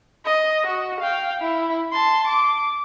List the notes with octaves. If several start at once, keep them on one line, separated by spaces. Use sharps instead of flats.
D#5
F#4
F5 G5
E4
A5 C6
D6